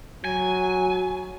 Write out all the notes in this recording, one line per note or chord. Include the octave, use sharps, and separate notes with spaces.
F#3 G#5